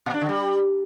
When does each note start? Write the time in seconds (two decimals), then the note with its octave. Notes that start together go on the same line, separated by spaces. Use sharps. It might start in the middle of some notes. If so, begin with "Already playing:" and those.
0.06 A#2
0.14 D4
0.21 D3
0.29 G3